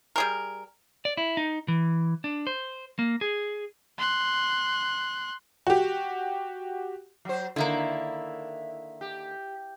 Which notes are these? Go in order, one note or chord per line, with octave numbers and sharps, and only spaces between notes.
G3 G#4 A#4
D5
E4
D#4
E3
D4
C5
A#3
G#4
C6 F#6
F#4 G4
F#3 C5
D3 D#3 A#3 E4
G4